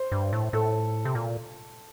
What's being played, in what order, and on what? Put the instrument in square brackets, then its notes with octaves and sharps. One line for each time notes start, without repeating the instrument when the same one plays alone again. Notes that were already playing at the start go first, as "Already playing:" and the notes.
Already playing: [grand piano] C5
[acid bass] G2
A2
[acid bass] A2 [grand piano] A4
[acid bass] C3
A#2